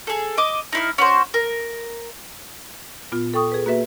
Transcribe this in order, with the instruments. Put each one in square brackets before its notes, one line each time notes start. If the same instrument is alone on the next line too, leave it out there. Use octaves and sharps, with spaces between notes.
[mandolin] G#4 A4
D#5 D6
D#4 E4 F6
C#4 F#4 C5
A#4
[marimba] A#2 B3 F4
A4 G5 C#6 D#6
G#4 B4
A#3 F#4 B4 E5